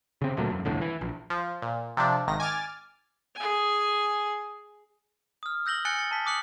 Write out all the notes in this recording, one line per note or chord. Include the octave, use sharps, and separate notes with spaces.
C#3 C4
D2 A#2 F#3 A3
E1 F#2
C2 F2 A2 D3
E3
A#1
F3
A#2
C3 F3 D4
G#1 D#3 A#6
G#5 D6 F6 A6
G#4 G#5
D#6 F6
E6 G6 A#6 F#7 G7
G#5 F#6 A6 C#7 G7
A6 C#7
A5 B6
D6 D#6 F#6 C#7 F#7